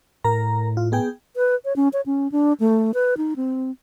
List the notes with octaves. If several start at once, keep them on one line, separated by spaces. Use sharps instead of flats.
A2 A#4 A#5
F4
B3 G#4 G5
B4
C#5
C#4
C#5
C#4
D4
A3
B4
D#4
C4